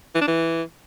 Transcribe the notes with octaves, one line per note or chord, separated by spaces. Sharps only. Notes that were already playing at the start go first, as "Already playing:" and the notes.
E3
D4
E3